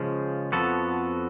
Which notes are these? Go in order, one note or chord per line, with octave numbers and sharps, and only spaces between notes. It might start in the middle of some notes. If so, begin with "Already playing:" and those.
Already playing: C#3 F3 G#3
F2 F3 B3 F#4 A4